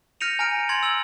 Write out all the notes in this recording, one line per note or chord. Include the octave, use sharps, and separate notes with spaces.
F6 G6 A#6 C#7 D#7 F7
G#5 A#5 F6 D7
C6 G#6 A6 F7 F#7
E6 F#7